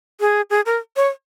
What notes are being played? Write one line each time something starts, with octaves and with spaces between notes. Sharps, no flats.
G#4
G#4
A#4
C#5